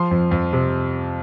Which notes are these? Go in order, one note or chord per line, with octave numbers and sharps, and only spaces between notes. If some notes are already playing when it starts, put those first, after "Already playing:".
Already playing: F3 C6
F2
F2
C3